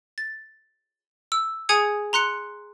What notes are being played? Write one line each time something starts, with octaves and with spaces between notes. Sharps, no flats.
A6
E6
G#4 G#5 D#6 G#6 C#7
A#5 C6 F#6 C#7